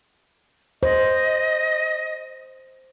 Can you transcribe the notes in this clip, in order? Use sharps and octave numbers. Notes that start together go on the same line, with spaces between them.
C5 D#5